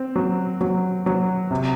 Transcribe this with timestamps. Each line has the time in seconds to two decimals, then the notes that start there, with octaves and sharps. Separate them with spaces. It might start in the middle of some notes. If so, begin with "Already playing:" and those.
Already playing: C4
0.16 F#3
0.61 F#3
1.06 F#3
1.51 C3